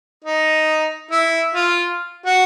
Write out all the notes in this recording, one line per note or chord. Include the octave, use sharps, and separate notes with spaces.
D#4
E4
F4
F#4